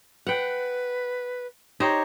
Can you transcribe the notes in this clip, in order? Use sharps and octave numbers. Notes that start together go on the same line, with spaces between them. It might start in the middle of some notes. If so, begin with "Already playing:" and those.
B4 F#5 G5
D#4 G4 C5 C#5